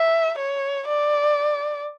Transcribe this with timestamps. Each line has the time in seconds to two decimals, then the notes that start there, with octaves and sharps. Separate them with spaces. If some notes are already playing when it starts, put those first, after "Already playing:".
Already playing: E5
0.38 C#5
0.89 D5